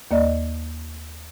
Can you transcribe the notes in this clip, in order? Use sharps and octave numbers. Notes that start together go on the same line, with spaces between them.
D#2 A#3 D5 D#5